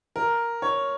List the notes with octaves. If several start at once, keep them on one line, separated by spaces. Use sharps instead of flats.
A#4
C#5